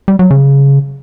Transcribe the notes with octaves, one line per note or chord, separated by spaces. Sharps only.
G3
F#3
C#3